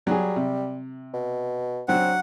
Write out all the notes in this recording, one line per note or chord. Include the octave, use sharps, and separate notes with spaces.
F#3 G3 G#4
C3
B2
F#3 C4 D4 F#5